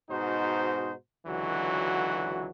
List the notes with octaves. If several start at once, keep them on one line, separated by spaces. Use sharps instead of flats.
G#2 B2 D#4 F#4 C5
C#2 D3 E3 F#3 F#4